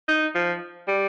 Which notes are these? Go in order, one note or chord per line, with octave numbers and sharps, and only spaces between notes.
D#4
F3
G3